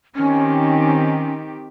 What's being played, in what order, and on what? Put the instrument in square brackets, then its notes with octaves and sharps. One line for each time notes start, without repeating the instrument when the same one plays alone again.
[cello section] D#3 C4 G4 [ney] C#4